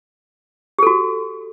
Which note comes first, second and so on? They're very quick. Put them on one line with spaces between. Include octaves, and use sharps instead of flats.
G4 A4 F#4